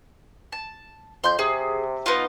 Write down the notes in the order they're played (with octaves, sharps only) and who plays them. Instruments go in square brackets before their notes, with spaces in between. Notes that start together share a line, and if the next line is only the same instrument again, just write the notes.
[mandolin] A5
[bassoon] F2 [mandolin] C6 G6
[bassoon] C3 [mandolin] G#4
[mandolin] B3 D#4 F4